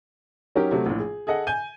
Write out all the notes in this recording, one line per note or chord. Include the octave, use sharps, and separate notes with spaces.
F#3 C#4 D#4 G4 A#4
C3 F#3 A3
A#1 A2
G#4
G#4 A4 D#5 F#5
G#5 G6 D#7